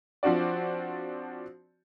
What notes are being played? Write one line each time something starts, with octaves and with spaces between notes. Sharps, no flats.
F3 C4 D4 F#4 D5